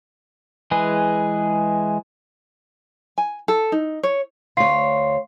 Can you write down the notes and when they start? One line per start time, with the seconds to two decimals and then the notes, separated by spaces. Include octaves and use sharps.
0.71 E3 G#3 G#4 B4
3.18 G#5
3.48 A4
3.72 D#4
4.03 C#5
4.57 D2 C#5 F5 C6 C7